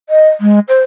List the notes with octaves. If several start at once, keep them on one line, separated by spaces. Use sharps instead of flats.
D#5
G#3
C5